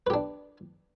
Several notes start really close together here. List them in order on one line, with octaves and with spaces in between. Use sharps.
B4 G4 D4